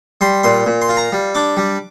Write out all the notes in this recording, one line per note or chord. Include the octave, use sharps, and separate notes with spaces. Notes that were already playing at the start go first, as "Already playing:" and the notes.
G3 C6
A#2 C6
A#2
C6
F4
A#5
G3
D4 D6
G3